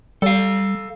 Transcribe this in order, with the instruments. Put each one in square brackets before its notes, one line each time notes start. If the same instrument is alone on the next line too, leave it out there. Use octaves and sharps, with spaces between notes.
[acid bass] G3 [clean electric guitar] A4 F5